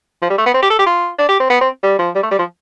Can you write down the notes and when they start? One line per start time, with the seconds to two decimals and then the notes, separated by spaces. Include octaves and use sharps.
0.22 F3
0.30 G3
0.38 A3
0.46 B3
0.54 C4
0.62 G4
0.70 A4
0.79 G4
0.86 F4
1.18 D4
1.29 G4
1.40 C4
1.50 B3
1.61 C4
1.83 G3
1.99 F3
2.15 G3
2.23 A3
2.31 G3
2.39 F3